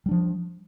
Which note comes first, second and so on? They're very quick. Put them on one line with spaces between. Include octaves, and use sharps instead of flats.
G3 D4 F3